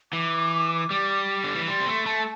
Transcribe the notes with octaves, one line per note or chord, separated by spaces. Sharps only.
E3 D6
G3
D3
E3
G3 C6
C4
A3
A3 A5